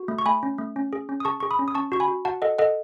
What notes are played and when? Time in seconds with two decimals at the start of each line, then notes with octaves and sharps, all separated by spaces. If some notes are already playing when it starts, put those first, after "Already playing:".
Already playing: F#4
0.08 A3
0.18 C#6
0.26 A3 G#5 B5
0.43 C#4
0.58 A3
0.76 C#4
0.93 G#4
1.09 C#4
1.20 D#6
1.25 G#4 A5 C#6
1.40 G#4 C#6
1.51 B5 D#6
1.59 C#4
1.68 D#6
1.75 C#4 A5 C#6
1.92 F#4 C#6
2.00 G#5 B5
2.08 F#4
2.25 F#4 F#5 A5
2.42 A4 D#5 F#5
2.59 A4 D#5 F#5